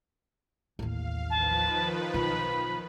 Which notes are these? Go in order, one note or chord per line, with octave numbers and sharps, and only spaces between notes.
A1 D#2 F5
D#3 F3 B4 A5
B1 F4 B5